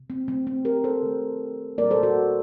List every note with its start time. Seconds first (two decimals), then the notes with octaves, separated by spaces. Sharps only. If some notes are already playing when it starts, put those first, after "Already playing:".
Already playing: C3
0.10 C4
0.28 D#3 F#3 A3 C4
0.47 C4
0.65 G4 A#4
0.84 A4 C5
1.03 D#3 A3
1.78 A#2 G3 A#3 A#4 D5
1.91 A4 C5
2.03 F#4 A4